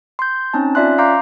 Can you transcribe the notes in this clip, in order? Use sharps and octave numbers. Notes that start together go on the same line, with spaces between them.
C6 G6
C4 C#4 D#4 A5
C#4 F4 D5 E5 C6 F#6
F5 A#5 C6 D6 G6